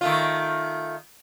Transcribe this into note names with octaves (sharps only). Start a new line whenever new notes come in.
D#3 A3 F4